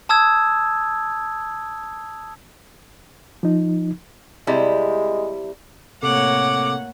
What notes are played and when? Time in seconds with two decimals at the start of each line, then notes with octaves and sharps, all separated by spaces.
0.09 A5 D#6 E6 G#6
3.43 F3 D#4
4.47 C3 G3 G#3 E4
6.03 A2 C3 A#3 C4 A4 C#5 F#5 D6